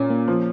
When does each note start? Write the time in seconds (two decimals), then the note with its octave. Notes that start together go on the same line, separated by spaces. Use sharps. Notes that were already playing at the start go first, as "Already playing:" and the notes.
Already playing: A#2 C#4
0.10 A#3
0.28 F3